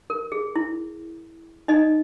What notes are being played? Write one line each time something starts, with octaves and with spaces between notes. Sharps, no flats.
A#4
G#4
E4
D#4 D#5